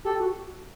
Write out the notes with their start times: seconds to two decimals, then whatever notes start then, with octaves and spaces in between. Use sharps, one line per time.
0.05 G4 A4
0.20 F#4